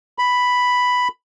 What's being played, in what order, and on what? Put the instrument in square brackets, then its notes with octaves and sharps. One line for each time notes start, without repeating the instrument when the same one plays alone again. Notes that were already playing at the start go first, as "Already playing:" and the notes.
[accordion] B5